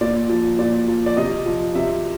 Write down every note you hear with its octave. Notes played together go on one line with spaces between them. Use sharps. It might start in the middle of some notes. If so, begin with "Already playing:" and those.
A#2 D5
F3
A#2 D5
F3
D5
C3 D#5
F3
C3 E5